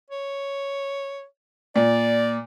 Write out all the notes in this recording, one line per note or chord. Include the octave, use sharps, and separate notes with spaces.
C#5
A#2 D5